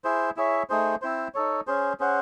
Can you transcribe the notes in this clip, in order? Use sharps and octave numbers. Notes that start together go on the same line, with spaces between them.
E4 G#4 C5
E4 G#4 C#5 E5
A3 D#4 G#4 C5
C4 E4 C5
D#4 A4 C#5
C#4 G#4 C5
C#4 G#4 C5 F#5